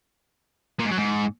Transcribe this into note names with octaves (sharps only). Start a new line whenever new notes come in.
A#2
G#2
F#3
G#2